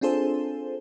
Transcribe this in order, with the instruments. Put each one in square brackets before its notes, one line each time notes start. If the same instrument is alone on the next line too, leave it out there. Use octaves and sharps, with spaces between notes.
[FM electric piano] C4 D4 F4 G#4 A4 C5